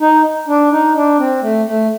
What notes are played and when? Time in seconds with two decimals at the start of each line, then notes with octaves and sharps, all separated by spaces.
0.01 D#4
0.48 D4
0.72 D#4
0.96 D4
1.19 C4
1.42 A3
1.66 A3